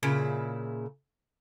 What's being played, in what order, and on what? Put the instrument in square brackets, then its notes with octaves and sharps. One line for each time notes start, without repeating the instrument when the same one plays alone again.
[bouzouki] A#2 C#3 E4